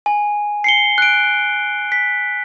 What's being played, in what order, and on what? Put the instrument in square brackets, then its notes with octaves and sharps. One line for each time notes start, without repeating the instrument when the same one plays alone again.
[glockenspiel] G#5
C7 C#7 G7
F#6 D7
B6